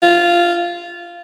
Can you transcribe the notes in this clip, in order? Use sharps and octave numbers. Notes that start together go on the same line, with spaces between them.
F4